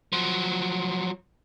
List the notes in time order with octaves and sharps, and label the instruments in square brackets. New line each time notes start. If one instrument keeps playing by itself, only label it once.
[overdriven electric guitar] F3 F#3